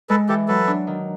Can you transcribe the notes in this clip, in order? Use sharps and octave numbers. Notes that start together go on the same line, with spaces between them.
G#3 A4 B4
E3 G4 A4
F#3 A4 B4
D4
D#3